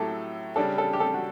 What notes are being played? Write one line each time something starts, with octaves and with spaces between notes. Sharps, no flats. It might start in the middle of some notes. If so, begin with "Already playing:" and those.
Already playing: A2 F#3 A3 G4 A4
C#3 G3 D4 A4
A4
G4
A4
F#4